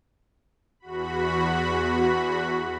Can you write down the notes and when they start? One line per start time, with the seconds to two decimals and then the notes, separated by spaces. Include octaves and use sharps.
0.80 E2 F#4 B5